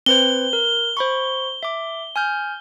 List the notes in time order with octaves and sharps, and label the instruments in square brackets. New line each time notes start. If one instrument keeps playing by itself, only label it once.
[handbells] C4 B4 C5 [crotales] G7
[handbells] A#4
C5 B5 C#6
E5 D6
G#5 F6 G6